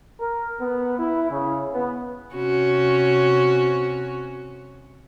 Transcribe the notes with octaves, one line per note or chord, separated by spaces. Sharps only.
A#4
B3
E4
C#3
B3
C3 C#4 F#4